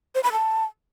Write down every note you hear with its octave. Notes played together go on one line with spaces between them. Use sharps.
C5
B5
A5